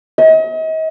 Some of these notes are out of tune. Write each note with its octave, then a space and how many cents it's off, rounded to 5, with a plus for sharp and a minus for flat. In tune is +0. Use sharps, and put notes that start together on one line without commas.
D#5 +40